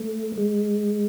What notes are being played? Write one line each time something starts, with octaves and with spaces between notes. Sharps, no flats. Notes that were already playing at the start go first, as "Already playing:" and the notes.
Already playing: A3
G#3